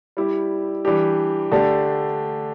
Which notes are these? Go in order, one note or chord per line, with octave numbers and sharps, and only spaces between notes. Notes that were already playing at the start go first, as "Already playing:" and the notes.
G3 E4 G4
E3 G3 D4 G4
D3 A3 D4 G4